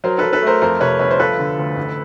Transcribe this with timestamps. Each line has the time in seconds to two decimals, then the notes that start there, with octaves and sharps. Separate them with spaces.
0.04 F#3 A#4 C5
0.18 F#3 A4 B4
0.33 A4 B4
0.42 A3 A#4 C5
0.62 F2 A#4 C5
0.80 C3 B4 C#5
0.99 G1 B4 C#5
1.11 C5
1.20 F3 A4 B4
1.39 D3
1.58 D2
1.76 A1